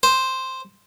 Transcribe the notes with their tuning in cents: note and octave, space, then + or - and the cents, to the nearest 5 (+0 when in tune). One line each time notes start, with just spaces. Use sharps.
C5 +0